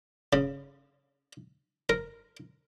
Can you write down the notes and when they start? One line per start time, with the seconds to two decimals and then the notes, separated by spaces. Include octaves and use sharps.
0.33 C#3
1.89 A#4